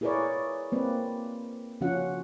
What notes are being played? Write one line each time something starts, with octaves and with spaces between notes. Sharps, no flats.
E4 G#4 A#4 B4 C#5 D5
A#3 C4 B4 D5
C#3 F3 C#4 F4 F#4 F#5